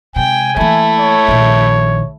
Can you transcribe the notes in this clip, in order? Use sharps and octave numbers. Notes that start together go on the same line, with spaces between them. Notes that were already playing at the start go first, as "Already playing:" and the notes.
C3 G#3 G5 G#5
E3 A3 A#3 E4
C#5
A#1 D#3